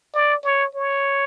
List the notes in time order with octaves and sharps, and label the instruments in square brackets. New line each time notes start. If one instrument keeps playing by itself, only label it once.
[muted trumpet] D5
C#5
C#5